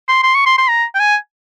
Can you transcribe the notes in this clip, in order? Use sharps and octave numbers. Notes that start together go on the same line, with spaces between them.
C6
C6
C#6
C6
C6
A#5
G5
G#5